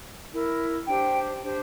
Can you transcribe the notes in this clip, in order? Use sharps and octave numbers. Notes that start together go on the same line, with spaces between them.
E4 A#4
D4 G4 C5 G5
D4 G4 C5